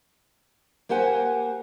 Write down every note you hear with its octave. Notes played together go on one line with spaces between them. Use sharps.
A#3 G4 C5 F#5 G#5